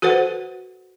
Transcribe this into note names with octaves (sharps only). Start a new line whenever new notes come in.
F#4 A4 B4 C5 F#5